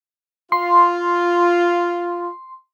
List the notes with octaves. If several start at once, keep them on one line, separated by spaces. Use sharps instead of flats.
F4 C6